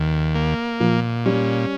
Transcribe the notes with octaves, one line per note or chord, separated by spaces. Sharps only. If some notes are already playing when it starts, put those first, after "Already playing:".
Already playing: D#2
A#3
A#2 F3
G3 C#4